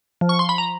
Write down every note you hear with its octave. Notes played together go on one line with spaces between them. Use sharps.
F3
C#6
C6
B5
A#5